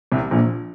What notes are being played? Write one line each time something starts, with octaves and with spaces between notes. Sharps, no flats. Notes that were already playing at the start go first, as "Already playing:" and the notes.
C2 C3
A#1 A#2